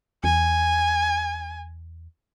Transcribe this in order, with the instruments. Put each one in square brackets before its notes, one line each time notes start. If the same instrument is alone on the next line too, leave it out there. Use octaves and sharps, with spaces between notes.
[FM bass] E2 [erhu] G#5